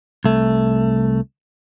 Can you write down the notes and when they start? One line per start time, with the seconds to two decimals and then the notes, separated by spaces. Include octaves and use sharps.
0.24 C2 A3